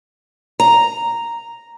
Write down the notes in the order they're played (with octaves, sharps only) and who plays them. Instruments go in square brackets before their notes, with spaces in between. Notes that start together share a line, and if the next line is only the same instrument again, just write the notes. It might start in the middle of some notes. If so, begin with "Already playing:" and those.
[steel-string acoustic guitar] A#5